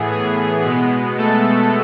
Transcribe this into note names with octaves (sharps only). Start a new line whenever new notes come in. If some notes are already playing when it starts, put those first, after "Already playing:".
Already playing: A2 E3 B3 G#4
G#4
B2 G#3 B3
A3 A4